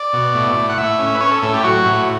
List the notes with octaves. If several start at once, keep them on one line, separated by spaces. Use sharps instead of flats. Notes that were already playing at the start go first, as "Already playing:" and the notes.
Already playing: D5
B2
A2
A2
F#5
A2 E5
C#4
B4
C#4 C#5
A4
A2 A4
G4
F#3 F#4
A2